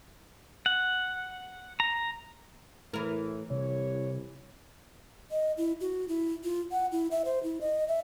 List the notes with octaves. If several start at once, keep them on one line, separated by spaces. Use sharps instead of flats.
F#5
A#5
A2 E3 A#4
C2 C3 C#5
D#5
E4
F#4
E4
F4
F#5
E4
E5
C5
E4
D#5
E5